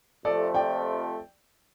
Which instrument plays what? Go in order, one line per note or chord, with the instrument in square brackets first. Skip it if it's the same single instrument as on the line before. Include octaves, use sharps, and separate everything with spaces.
[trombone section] F2 C3 F3 A3 [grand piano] A4 D5
[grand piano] D5 G5